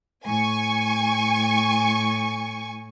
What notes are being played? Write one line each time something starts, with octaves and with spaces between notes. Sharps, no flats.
A2 G#5 C#6